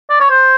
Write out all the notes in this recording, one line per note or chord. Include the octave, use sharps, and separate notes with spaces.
D5
C#5
C5